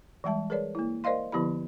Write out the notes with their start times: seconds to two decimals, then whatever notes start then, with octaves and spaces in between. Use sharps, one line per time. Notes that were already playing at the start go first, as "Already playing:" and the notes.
0.24 E3 G3 G#3 E5 A5
0.50 G#4 A#4 B4 C#5 D5
0.75 A#3 E4
1.04 A#4 C5 D5 D#5 F5 C6
1.32 D3 F3 B3 E4 G4 B5